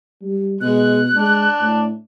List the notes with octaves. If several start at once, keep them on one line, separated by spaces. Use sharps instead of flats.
G3
B2 G#3 F#6
G#3 D4
A2